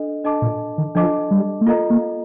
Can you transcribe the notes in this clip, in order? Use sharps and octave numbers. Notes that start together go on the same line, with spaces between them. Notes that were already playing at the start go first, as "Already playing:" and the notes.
Already playing: D4 A4 D#5
D4 A4 D#5 A5 D6
A#2
D#3
F3 D4 A4 D#5 A5 D6
G3
A3
A#3 F4 A4 D#5 A#5
A#3